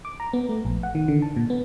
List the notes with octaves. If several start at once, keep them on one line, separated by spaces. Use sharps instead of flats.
D6
A#5
B3
A3
A#1
F#5
D#3
D3
A5
A#2
B3